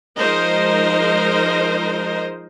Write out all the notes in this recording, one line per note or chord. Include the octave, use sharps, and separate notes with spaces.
F3 G#3 D#4 A#4 C5 D#5